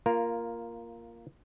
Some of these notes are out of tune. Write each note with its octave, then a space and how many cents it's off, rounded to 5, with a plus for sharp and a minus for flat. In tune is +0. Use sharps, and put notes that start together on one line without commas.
A#3 +0 F4 -15 A#4 +0